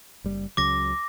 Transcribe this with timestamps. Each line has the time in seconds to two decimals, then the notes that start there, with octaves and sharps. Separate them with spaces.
0.24 F#1 G3
0.57 C#2 C#3 F#3 D6 A#6